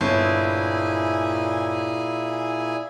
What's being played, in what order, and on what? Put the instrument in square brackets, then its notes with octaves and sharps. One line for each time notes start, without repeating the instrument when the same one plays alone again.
[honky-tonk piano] G1 [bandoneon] A#2 [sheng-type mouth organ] E4 G#4 G#5